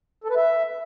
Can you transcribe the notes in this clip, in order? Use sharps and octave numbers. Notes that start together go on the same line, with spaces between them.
A4
B4
E5